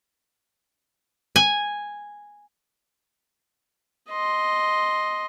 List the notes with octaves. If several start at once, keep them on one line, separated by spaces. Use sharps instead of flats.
G#5
D#5 C6